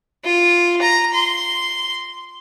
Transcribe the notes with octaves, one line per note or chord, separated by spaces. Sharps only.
F4
A#5
C6